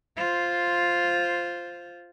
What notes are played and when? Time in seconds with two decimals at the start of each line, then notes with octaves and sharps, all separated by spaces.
0.17 F4 C5